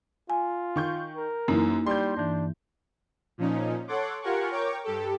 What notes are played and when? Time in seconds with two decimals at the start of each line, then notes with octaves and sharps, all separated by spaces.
0.30 F4 G#5
0.76 D#3 C#6 G6
1.17 A#4
1.48 F#2 E3 A#3 D#4 E4
1.86 G3 C6 G6
2.17 G2 E3 D4
3.38 A#2 F3 C#4 D#4
3.88 A4 C#5 F#5 C6 D6
4.22 F4 G4 A#4 F#5 G#5 C#6
4.51 A#4 C#5 G5 C#6 D6
4.84 G2 G4 A4